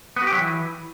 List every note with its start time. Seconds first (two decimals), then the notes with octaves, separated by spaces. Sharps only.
0.16 B3
0.22 F#4
0.27 G4
0.32 F#3
0.38 E3